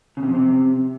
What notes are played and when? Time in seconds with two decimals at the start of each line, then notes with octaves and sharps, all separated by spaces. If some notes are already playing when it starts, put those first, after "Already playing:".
0.17 C#3
0.23 C3
0.29 F2
0.34 C3